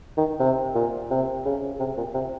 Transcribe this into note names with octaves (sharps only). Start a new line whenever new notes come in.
D#3
C3
A#2
C3
C#3
C3
A#2
C3